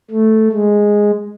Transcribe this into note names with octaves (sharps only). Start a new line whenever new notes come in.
A3
G#3